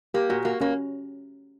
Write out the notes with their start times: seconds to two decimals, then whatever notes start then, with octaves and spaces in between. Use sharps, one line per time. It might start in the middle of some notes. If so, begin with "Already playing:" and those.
0.14 A#3 G4
0.30 A#2 F#4
0.45 A#3 F#4
0.61 A#3 C#4